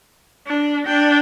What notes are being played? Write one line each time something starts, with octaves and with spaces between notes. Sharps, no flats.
D4
D4 G5